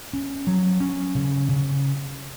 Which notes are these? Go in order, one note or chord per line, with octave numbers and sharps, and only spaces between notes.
C#4
F#3
C#4
C#3
C#3